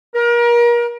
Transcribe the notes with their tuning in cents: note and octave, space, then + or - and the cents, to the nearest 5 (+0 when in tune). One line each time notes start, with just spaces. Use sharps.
A#4 +35